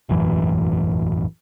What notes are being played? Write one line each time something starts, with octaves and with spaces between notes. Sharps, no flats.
E1 A1 F#2 E3